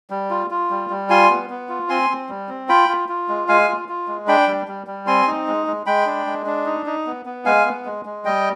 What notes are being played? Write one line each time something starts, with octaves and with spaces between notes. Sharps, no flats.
G3
F4
F4
G3
G3
F4 G#5 C6
B3
B3
F4
C4 G#5 C6
C4
G3
C4
F4 G5 B5
F4
F4
G#3
G#3 F5 G#5
F4
F4
G#3
D4 G5 B5
G3
G3
G3
C4 G#5 C6
D#4
G#3
G#3
G#3 G5 B5
D4
G#3
D4
D#4
D#4
B3
B3
G#3 F5 G#5
B3
G#3
G#3
G3 D#5 G5